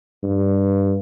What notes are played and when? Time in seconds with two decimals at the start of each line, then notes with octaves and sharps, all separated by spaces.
0.23 G2